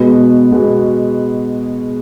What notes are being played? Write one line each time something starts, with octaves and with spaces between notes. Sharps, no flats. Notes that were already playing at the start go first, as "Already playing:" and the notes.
Already playing: B2 G#3 B3 F#4 B4
B2 G#3 B3 F#4 B4